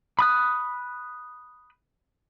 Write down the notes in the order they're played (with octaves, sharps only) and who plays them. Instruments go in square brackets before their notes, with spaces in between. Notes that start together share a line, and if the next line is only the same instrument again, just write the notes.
[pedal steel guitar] B5 D#6 F#6